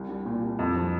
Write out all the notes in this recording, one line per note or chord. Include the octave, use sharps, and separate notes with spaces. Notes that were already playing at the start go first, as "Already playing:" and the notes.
Already playing: C2
G3
A#2
C2
F2
F3